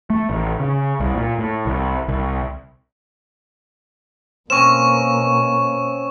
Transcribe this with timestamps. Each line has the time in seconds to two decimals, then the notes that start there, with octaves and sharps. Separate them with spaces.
0.10 A3
0.29 A1
0.60 C#3
1.00 C2
1.15 A#2
1.38 A2
1.66 C2
2.08 C2
4.50 B2 A#3 C4 C#4 C#6 E7